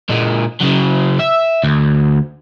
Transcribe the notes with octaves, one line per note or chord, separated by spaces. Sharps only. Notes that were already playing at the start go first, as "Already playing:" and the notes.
A#2 G#3
C#3 F#3
E5
D2